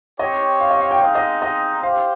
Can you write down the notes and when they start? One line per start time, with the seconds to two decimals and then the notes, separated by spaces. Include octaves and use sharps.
0.19 C4 G4 C#5 D#5
0.60 F5
0.71 D#5
0.81 F5
0.91 G5
1.01 G#3 C4 D#4 F5
1.15 D#5
1.42 D#5
1.83 G4 C5 F5